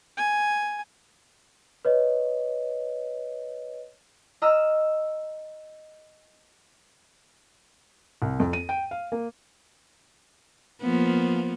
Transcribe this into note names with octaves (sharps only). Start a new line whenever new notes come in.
G#5
B4 C#5 D#5
D#5 A#5 E6 F6
C2
F2
D#7
G5
F5
A#3
F3 A#3 B3